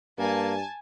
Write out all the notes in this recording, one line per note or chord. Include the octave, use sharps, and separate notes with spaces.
G2 A#3 G#5 A5